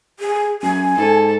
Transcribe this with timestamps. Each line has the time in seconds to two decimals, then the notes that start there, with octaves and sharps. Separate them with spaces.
0.20 G#4
0.62 F#2 G#5
0.97 G#2 A4